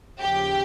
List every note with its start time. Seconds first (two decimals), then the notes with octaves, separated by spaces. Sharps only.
0.20 D#2 C#3 F3 G4